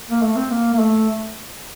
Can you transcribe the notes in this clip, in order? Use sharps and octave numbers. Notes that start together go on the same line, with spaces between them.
A#3
A3
C4
A#3
A#3
A3